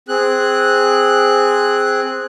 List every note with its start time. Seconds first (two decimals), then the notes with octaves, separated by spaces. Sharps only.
0.08 C4 G#4 F#6